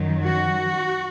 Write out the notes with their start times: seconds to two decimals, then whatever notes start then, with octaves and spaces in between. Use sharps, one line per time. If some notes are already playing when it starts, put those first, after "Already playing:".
Already playing: F#2 D#3 F#3
0.26 F#4